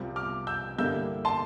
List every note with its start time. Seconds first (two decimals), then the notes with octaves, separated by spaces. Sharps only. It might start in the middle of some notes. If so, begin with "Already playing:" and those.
Already playing: C2 C3 G3 C4 F4
0.16 D6 F6
0.47 E6 G6
0.78 G2 D3 G3 A#3 E4 E6 G6
1.25 A5 C6